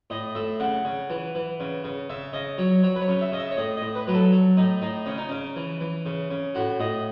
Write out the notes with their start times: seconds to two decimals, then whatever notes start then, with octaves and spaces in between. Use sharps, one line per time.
0.10 A2 D#5
0.35 A2 E5
0.60 C#3 F#5
0.85 C#3
1.10 E3
1.35 E3
1.60 C#3
1.84 C#3
2.09 C#3 E5
2.33 C#3 D#5
2.58 F#3 C#5
2.83 F#3 C#5
2.96 B4
3.02 C#5
3.08 C#3
3.21 E5
3.32 C#3 D#5
3.39 E5
3.51 C#5
3.57 A2 D#5
3.77 D#5
3.82 A2
3.95 B4
4.07 F#3 B4
4.14 A4
4.33 F#3
4.57 A2 D#4
4.81 A2 D#4
5.06 C#3 C#4
5.18 D#4
5.29 C#3 C#4
5.56 E3
5.81 E3
6.06 C#3
6.31 C#3
6.55 A2 F#4
6.80 A2 D#5